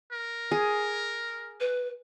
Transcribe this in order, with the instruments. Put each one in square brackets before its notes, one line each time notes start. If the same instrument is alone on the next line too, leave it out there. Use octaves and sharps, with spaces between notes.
[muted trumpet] A#4
[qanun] G#4
[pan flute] B4